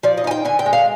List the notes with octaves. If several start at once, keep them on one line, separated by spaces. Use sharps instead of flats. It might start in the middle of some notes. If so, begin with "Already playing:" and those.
F3 D5
D#5
D#4 G#5
G5
D3 G#5
G5
G#3
F5